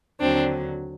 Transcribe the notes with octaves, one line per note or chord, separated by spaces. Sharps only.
D#2 D3 F#3 C4 D4